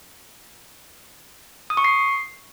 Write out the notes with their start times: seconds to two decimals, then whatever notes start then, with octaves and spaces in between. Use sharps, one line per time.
1.70 D#6
1.77 C#6
1.84 C7